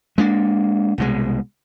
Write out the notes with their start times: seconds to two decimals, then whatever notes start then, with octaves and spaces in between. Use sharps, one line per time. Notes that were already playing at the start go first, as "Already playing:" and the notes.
0.18 G#3 A#3 D4
0.98 C2 B2 G#3